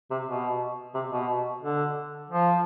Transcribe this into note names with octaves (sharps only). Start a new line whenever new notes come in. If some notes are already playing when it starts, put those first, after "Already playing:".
C3
B2
C3
B2
D3
F3